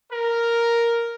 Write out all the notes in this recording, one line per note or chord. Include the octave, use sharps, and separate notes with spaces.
A#4